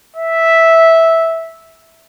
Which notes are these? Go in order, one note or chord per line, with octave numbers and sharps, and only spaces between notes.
E5